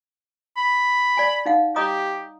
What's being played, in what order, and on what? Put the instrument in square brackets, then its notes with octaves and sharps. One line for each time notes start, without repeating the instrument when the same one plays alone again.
[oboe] B5
[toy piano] D5 G#5
D#4 F5 F#5
[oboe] G4 [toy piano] D#5 A#5 D#6